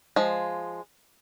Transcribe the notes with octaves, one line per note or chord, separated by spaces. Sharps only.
F3 G#3